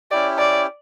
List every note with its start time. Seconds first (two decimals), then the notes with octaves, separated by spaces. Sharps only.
0.11 C#4 E4 G4 D5
0.39 D5